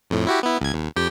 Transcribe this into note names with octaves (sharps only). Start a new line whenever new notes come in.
F2 A2
E4 F#4 G4
B3 E4
C#2 G#6
D#2
F2 G4 G5